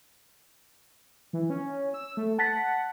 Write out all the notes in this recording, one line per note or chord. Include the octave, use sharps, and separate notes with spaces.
E3
C#4
E6
A3
F#5 A5 A6 B6